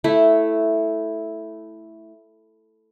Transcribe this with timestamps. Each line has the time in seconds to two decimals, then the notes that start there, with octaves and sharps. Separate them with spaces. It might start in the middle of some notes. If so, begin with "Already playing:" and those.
0.04 A3 E4